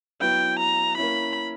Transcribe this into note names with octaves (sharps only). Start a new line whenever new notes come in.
F#3 B3 E4 B4 G5
A#5
A#3 C#4 E4 B5